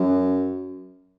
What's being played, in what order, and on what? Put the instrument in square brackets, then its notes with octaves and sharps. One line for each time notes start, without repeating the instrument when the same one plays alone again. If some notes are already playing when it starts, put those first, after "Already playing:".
Already playing: [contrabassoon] F#2